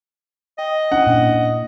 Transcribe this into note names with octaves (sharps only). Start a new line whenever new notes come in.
D#5 G5
C#4 D4 E4 F#5
A#2 D#6